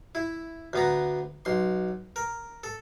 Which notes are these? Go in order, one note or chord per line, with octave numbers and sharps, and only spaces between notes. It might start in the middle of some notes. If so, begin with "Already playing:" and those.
E4
D2 B3 A#5
B1 C6
A#4
A4